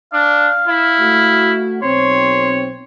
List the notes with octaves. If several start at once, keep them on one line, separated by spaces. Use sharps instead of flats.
D4 F5
E4
A3 F#4
B1 C4 C#5 C6